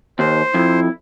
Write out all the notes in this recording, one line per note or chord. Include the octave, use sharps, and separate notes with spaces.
D#2 C5
F2 E4